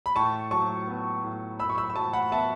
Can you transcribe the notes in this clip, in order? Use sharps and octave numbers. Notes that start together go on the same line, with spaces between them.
B5
A2 A5 C#6
F#3 A5 C#6
B3
A2
F#2 B5 E6
C#6
B5 E6
E6
F#3 A5 C#6
F#5 B5
B3 E5 A5